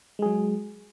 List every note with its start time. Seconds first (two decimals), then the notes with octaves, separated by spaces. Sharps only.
0.19 G#3
0.22 G#4
0.26 F#3